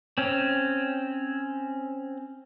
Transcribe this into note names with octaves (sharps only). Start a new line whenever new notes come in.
C4 C#4